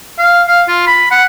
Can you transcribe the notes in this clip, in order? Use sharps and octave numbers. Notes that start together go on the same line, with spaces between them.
F5
F5
F4
B5
F#5